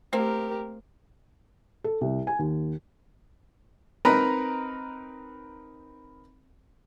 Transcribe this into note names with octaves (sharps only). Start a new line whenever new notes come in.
A3 A#3 C4 G4 A#4
A4
C2
G#5
D#2
C4 D#4 A#4 B4 A#5